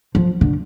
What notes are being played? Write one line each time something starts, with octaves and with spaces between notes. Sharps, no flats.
F3
D3